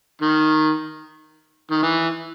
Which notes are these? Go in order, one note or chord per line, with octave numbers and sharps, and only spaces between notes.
D#3
D#3
E3